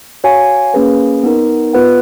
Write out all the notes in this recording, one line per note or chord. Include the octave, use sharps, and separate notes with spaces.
F#4 C#5 F5 G#5
A#3 C#4 G#4 B4
B3 D#4 A#4
B3 F4 B4 F#5